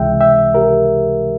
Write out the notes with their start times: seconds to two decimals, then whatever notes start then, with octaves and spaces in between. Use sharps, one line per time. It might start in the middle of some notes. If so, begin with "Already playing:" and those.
Already playing: C#2 C3 E3 G#3 E5 G5
0.20 E5 G5
0.55 G4 A#4